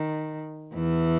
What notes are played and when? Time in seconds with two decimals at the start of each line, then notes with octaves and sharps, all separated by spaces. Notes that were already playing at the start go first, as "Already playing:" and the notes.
Already playing: D#3
0.75 E2 E3